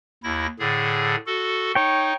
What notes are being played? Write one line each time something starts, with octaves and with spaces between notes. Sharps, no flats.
D#2 E4 A#6
A2 D3 G#4
F#4 A4
D#4 C#5 G5